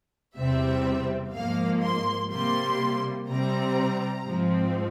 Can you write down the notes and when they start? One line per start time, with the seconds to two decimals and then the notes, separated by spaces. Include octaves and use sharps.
0.36 E2 C3 G3 C4 E5
1.33 G#2 F3 A#3 F5
1.83 C6
2.30 C3 G3 A#3 C6
3.29 C3 G3 C4 A#5
4.26 G#2 F3 C4